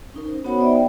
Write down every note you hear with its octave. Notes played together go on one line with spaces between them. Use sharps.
C#4 D#4 A#4
C5
B3 F#4 C5 C#5 F#5 B5
D#4 C5 D5 E5
G5